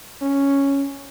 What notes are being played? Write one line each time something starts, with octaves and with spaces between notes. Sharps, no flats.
C#4